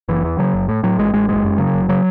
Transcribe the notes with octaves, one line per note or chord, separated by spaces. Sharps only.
F#1 E3
E2
C#3 F#3
F#1
A2
A2 F#3
A1 G#3
A1 G#3
F#1 G#3
F#2
C#3 F#3
F#1
C#3 F#3